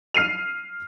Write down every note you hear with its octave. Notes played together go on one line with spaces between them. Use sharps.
F6 C7 D#7 F7